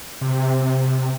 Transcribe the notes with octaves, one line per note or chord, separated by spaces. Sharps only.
C3